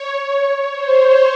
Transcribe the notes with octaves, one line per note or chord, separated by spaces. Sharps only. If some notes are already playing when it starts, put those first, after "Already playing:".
Already playing: C#5
C5